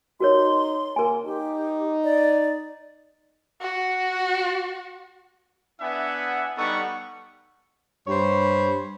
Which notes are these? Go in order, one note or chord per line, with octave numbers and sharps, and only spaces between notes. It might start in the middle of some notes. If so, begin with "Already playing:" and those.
D#4 F#4 A#4 C#5 C6
A#3 A#4 G#5
D#4 G4
D5
F#4
B3 D4 E4 E5 F#5 G#5
G3 B3 D#4 A4 F#5 C#6
G2 C5 C#5 B5